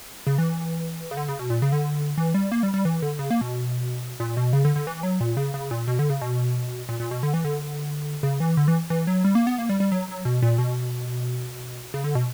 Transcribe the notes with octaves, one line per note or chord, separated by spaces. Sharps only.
C#3
E3
C#3
D3
C#3
B2
A#2
C#3
D3
E3
G3
A#3
G3
G3
E3
D3
C#3
A#3
B2
A#2
B2
C#3
D3
D3
E3
F#3
A#2
C#3
C#3
A#2
B2
D3
C#3
B2
A#2
A#2
B2
D3
E3
D3
C#3
E3
D3
E3
E3
F#3
G3
A#3
B3
A#3
G3
G3
F#3
F#3
B2
A#2
B2
C#3
D3
B2